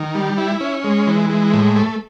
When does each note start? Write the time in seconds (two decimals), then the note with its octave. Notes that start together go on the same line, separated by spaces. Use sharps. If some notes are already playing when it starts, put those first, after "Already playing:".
Already playing: D#3
0.15 G3
0.38 E4
0.61 C#4
0.84 G#3
1.07 E3
1.30 G#3
1.54 A2
1.76 A3